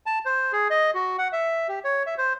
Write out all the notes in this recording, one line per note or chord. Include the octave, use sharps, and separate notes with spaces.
A5
C5
G#4
D#5
F#4
F#5
E5
G4
C#5
E5
C5